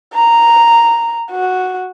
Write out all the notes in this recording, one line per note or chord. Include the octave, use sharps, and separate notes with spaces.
A#5
F#4